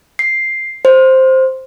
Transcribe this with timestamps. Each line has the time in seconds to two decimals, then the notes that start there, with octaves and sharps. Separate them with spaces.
0.19 C7
0.85 C5